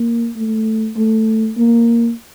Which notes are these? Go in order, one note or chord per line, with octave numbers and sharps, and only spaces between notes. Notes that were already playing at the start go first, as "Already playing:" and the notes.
Already playing: A#3
A3
A3
A#3